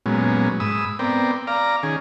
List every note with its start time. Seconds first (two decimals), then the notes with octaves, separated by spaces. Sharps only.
0.06 A#2 F#3 G#3 B3 C#4
0.60 G#2 B5 D#6 E6
0.99 B3 C4 A#4 D5 G5
1.47 D5 F5 A#5
1.83 D#3 C#4 G#4